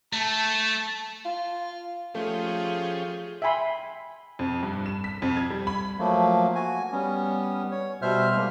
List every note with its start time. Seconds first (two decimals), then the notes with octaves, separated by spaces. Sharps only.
0.13 A3 A5
1.25 F4
2.15 F3 A3 C#4 F4 G4 G#4
3.42 E5 G5 G#5 B5 C6
4.39 F2
4.63 G2
4.86 E7
5.04 B6
5.22 F2
5.37 G#6
5.50 G3
5.67 B5
5.99 F3 F#3 A3 A#3
6.55 F#4 G#5
6.92 G3 B3 C#4
7.71 C#5
8.02 B2 G3 C5 E5 F6
8.36 G#3 A#3